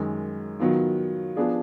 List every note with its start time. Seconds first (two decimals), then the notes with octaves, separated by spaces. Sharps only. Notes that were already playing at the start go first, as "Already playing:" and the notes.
Already playing: F#2 D#3 G#3
0.59 D#3 F#3 B3 F4
1.37 F3 B3 D4 G#4